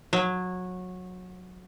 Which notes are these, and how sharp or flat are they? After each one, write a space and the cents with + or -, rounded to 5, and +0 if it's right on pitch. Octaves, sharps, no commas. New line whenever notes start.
F#3 -20